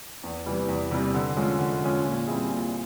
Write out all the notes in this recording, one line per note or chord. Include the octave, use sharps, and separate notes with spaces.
E2
C3 E3 G3
E2
C3 E3 G3
D3
F3 G#3 C#4
D3
F3 G#3 C#4
A#2
G3 C4 E4 G#4
A#2